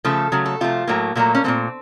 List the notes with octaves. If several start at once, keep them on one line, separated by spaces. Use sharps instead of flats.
C#3 F3 A3 A4
C#3 F#3 A3
A4
C3 F3 A3 F4
A2 F#3 A3 A#3
A#2 F#3 A3 A#3
C#4
A#2 F#3 A3 C4